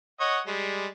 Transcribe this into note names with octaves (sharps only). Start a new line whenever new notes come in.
C#5 D#5 F#5
G3 G#3